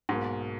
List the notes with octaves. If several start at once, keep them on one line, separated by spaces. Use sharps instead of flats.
B1 G#2 B2 A#3